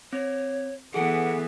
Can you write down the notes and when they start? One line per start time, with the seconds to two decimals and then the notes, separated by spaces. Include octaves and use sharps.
0.13 C4 C#5
0.94 E3 B3 G#4 A4 F#5